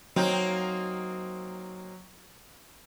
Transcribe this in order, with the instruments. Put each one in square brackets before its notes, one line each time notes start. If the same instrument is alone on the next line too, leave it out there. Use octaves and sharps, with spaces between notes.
[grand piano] F#3 [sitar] A#3 C4 D#4